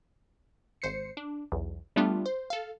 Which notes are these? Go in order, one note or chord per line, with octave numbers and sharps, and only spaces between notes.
G#1 C5 C7 C#7
D4
B1 E2
G3 A3 B3 D4 F4
C5
A4 F5